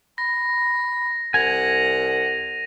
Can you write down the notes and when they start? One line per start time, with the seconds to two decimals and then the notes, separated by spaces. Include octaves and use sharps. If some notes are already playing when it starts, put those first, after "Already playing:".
0.18 B5 A#6
1.34 C2 F#5 G#5 A#6 D#7 F7